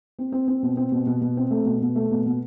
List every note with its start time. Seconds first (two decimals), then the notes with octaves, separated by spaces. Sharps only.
0.19 C4
0.32 C4
0.48 C4
0.63 B2
0.77 C4
0.92 B2
1.06 B2
1.21 B2
1.37 C4
1.51 A3
1.66 B2
1.81 B2
1.96 A3
2.10 B2
2.26 B2